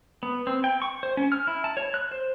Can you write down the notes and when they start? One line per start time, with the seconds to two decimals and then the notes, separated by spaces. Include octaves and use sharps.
0.23 B3
0.47 C4
0.64 G5
0.82 C#6
1.03 C5
1.17 C#4
1.32 F6
1.47 E4
1.64 A5
1.77 C#5
1.94 F#6
2.11 C5